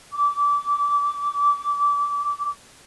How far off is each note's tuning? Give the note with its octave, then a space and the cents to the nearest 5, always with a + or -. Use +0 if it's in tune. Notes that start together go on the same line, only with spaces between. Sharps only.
D6 -25